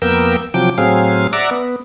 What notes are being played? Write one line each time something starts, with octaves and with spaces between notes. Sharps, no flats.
F2 A#3 B3 A#4 G5 E6
C3 F3 F#3 G5 D6
A2 F#3 C4 G#4 F5
D5 E5 F#5 A#5 D6
B3